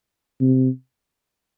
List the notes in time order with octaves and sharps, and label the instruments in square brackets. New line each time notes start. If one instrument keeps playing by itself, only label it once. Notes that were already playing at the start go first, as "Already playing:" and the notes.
[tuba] C3